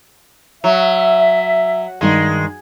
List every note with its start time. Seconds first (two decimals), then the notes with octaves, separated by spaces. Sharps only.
0.64 F#3 E5
2.01 G2 D#3 G#3 D#4